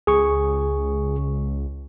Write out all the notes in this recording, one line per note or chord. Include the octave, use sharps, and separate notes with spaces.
C#2 G#4 C#6